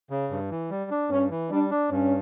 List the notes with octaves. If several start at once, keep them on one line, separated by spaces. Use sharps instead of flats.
C#3
G2
E3
G3
D4
G2 C#4
E3
G3 D4
D4
G2 C#4